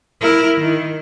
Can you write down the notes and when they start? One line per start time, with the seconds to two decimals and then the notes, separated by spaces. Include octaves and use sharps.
0.21 E4 A#4
0.58 D#3